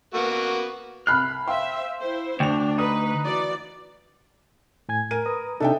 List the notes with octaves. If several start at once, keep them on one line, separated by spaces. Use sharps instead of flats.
A#3 B3 F#4
C2 B5 F6 F#6 C7
C5 E5 F5 G5 C6
E4 C5
D2 D4 G5 F7
D#4 B4 D#6
E3 F#4 D5
A2 G#5 G#6
A#4 D#7
B4 A#5 D#6
C3 D4 D#4 A4 E5 G5